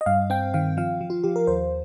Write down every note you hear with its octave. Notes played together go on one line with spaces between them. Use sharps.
D#5
G2 F5
C4 G5
D#3 F5
F3 F5
F3
F4
F3 G4
A#4
D#2 C5